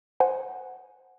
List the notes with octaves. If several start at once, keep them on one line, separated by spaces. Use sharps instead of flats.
C5 F#5 G#5